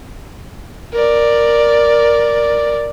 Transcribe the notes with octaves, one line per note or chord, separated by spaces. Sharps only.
A#4 D5